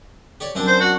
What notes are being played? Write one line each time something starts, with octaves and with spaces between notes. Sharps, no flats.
G4 C#5 D5
F#2 C4 D4
C5
F#4